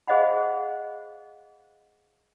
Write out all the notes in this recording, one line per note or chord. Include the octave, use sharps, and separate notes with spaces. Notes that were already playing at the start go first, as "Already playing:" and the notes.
G#4 C5 D#5 F5 F#5 B5